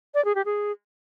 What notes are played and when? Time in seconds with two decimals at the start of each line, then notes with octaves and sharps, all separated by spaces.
0.14 D5
0.25 G#4
0.35 G4
0.46 G#4